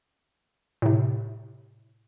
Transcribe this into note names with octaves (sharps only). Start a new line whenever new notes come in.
A2 C3